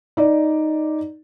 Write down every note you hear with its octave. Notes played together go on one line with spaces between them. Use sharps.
D#4 D5